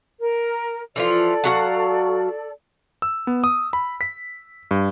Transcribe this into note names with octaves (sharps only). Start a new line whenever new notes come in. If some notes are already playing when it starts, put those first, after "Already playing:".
A#4
E3 F3 F4 A4 D5
F#3 F#4 F5
E6
B3
D#6
B5
B6
G2